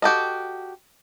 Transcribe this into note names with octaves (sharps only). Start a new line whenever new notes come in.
F#4 G4 A4 D#5